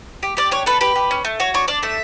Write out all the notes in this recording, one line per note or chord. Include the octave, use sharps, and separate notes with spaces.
G4
G4 D5
D4 C#5
A4 B4
G4 B4
G4
C#4
A3
F#4 C#5
D4 C#5
D4 D5
A3 E5